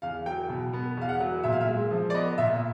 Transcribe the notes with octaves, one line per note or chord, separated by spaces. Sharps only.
E2 F5
F#3 G5
B2
B3
E2 F5
F#5
F#3
A#2 E5
F5
E5
G#3
F3
D5
B3 D#5
A#2 E5